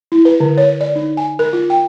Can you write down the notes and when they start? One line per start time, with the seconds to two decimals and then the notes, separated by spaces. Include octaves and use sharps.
0.12 E4
0.25 B4
0.40 D3
0.58 C#5
0.81 D5
0.96 D#4
1.17 G#5
1.39 A#4
1.53 F4
1.70 G5